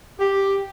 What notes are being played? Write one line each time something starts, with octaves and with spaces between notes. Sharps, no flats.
G4